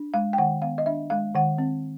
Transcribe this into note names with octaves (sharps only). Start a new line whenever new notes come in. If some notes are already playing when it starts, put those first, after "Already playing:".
Already playing: D4
G#3 F5
G5
D#3 F#5
B3 F5
D#5
D4 E5
G#3 F5
D#3 F#5
C4